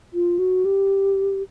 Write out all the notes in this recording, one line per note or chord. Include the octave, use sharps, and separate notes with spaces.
F4
F#4
G4